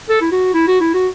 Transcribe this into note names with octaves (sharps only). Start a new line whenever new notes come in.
A4
E4
F#4
E4
F#4
E4
F#4